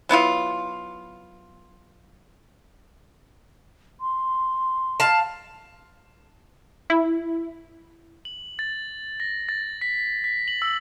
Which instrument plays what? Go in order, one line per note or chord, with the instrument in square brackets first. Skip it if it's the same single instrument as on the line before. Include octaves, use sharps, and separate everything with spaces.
[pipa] F#3 B3 E4 F4
[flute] C6
[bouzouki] F5 A5
[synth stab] E4
[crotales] F#7
A6
A#6
A6
B6
B6
F#7
E6